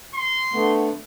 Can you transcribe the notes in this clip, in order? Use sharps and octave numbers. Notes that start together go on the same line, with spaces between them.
C6
D3 A3 B3